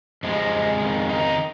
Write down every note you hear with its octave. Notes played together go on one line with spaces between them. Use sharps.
F2 C3 F3 G#3
F2 D#3
D#4